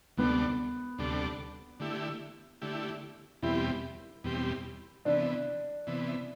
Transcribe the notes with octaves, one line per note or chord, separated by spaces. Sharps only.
D2 C3 G3 B3 D4 A4
D2 C3 G3 D4 A4
D3 A3 E4 G4
D3 A3 E4 G4
E2 B2 G3 C4 E4 G4
E2 B2 G3 C4 G4
C3 E3 B3 D4
C3 E3 B3